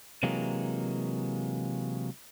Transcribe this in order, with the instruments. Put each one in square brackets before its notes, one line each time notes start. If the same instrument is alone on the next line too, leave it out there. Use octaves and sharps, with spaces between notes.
[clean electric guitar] C3 E3 F#3 G#3 A#3